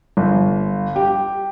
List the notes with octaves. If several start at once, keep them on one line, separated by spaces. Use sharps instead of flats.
G1
G4